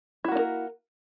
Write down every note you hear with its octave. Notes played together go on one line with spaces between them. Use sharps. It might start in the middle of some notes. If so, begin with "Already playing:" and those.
A#3 D4 E4 F#4 A#4